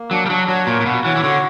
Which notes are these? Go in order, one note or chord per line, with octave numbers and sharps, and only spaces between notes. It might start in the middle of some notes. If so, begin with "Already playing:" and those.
Already playing: A#3
F#3 D4
G3
F#3 D4
F#3 C#5
A#2 A#3
A#2
B2 F#4
E3 C#5
E3
D3 F#4